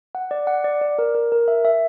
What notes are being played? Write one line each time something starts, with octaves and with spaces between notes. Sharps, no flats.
F#5
D5
F#5
D5
D5
A#4
A#4
A#4
E5
E5